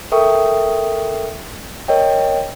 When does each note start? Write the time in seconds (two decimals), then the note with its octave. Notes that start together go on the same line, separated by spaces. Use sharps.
0.12 A4 A#4 E5 G5 C#6 D#6
1.88 A#4 C#5 D#5 G5